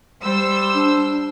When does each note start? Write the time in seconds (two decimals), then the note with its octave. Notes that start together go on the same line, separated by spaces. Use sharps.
0.24 G3 C5 E6
0.74 D4